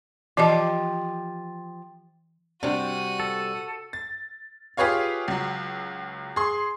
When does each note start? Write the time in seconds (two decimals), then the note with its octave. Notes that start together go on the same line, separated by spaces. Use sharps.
0.37 E3 F3 G4 D5 D#5
2.63 C3 G3 D4 F#4 D#7
3.20 A4
3.93 A6
4.77 F4 G4 G#4 B4 C#5 F5
5.28 C#2 F#3
6.36 G#4 C6